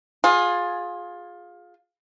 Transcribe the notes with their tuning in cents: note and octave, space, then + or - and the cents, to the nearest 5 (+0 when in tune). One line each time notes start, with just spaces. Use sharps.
F4 +20 G#4 +0